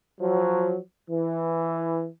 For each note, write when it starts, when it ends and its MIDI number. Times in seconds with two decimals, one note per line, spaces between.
0.21 0.78 53
0.21 0.78 54
1.11 2.07 52